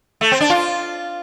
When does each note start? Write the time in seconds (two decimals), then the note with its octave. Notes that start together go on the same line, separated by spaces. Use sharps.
0.21 A3
0.31 C4
0.40 D4
0.50 F4